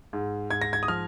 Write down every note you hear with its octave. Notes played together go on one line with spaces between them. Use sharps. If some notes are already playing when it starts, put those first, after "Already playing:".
G#2
G#2 G#6
A#6
G#6
D#6
F3 F6